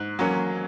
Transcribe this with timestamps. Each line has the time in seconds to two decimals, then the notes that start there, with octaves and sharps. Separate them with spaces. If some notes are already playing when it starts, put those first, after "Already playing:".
Already playing: G#2 F#6
0.19 F#3 A#3 C#4